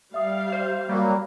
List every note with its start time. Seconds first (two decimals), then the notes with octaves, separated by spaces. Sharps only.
0.14 G3 E5 F5 D#6
0.52 C5
0.89 F#3 G3 A#3